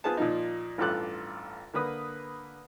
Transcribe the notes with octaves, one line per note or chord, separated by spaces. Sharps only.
B3 F4 G#4 B4 C5 A5
A#2 F3 D#4
A1 G2 F4 A4 D6 F#6
D3 A#3 B4 D#6